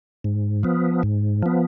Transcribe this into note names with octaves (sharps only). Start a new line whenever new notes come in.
G#2
F3 B3
G#2
F3 B3